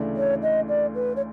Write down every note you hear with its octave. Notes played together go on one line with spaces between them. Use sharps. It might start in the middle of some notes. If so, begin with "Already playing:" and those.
Already playing: D2 C#3 E3 A3 D4
C#5
D#5
D5
B4
C#5